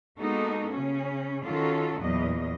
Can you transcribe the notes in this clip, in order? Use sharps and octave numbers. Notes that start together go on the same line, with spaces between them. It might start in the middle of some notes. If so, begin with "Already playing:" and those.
G#3 A#3 B3 D#4 F#4 A4
C#3 C#4
D#3 C#4 F4 F#4 A4
E2 A#2 F#3 D#5